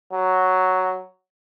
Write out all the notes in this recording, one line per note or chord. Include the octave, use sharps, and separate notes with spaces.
F#3